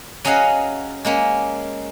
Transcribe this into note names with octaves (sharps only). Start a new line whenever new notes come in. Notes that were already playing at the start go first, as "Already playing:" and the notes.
F#3 C#4 G#4 D#5 F5 F#5
G#3 A#3 C#4